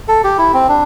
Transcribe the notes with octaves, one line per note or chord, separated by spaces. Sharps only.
A4
G4
E4
C4
D4